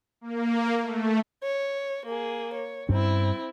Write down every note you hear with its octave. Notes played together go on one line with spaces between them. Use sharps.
A#3
A3
C#5
A#3 G#4
C#5
G2 C4 C#4 E4